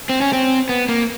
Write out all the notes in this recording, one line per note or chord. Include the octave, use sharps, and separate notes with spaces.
C4
C#4
C4
B3
A#3